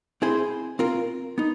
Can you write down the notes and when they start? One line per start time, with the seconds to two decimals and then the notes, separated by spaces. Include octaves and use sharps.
0.22 C4 E4 G#4 C5
0.79 C4 F4 A#4
1.38 B3 D#4